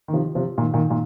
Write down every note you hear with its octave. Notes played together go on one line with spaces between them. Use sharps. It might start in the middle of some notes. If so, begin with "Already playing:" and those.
D#3
C3 F3
C3 F3
A#2 D#3
A#2 D#3
A#2 D#3